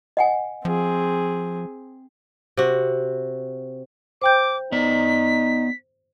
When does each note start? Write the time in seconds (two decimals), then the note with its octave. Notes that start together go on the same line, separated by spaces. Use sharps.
0.17 D#5 F#5 G#5
0.65 F3 C4 G#4
2.57 C3 F#4
4.22 C5 G5 D6 G6
4.72 B3 D#4 D5 B6